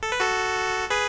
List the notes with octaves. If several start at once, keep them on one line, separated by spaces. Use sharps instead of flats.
A4
B4
F#4 A4
G#4 B4